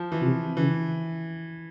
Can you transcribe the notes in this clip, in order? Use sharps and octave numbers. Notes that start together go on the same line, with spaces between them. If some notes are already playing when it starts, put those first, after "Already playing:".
Already playing: F3
E3
C3 F3
C#3 E3